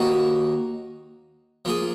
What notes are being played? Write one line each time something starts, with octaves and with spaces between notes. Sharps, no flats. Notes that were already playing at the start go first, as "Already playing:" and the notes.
Already playing: D#2 D#3 A#3 D#4 F#4
F3 A#3 F4 G#4